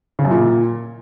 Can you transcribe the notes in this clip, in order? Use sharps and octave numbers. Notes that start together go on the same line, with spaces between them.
C#3
F#2
A#2